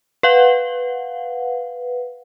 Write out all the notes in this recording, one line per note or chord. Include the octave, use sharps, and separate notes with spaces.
B4 F5 F#5